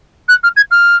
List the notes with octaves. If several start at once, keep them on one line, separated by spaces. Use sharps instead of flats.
F#6
F6
G#6
F6